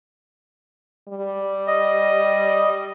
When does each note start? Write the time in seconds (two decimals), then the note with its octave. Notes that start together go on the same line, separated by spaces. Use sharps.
1.09 G3
1.67 D#5